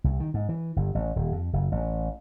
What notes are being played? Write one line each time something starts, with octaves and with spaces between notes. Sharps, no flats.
C2
D#3
G#2
E3
G1
A1
D#1
F2
F#1
A1